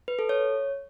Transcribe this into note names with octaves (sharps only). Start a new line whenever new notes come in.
B4
A4
C#5